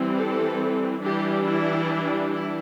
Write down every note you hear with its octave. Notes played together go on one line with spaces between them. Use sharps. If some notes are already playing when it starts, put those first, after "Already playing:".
Already playing: E3 G3 C4
A4
E3 G3 D4 G4
E4
E4